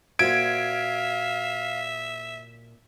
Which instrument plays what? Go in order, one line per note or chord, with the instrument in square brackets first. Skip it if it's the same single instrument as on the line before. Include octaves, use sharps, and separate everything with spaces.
[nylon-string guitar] A#2 F#4 C5 [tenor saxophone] E5 [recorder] F5 [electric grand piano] G#6 D7